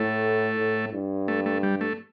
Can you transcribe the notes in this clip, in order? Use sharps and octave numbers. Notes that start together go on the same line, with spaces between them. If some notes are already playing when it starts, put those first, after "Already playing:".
Already playing: A2 A3
A2
G2
A3
A3
G3
A3